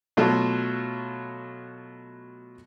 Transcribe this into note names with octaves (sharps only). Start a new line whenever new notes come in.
B2 F#3 A3 F4